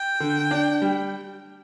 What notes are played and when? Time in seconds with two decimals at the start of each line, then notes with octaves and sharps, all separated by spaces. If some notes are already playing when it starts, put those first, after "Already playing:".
Already playing: G5
0.20 D3
0.51 D4
0.82 G3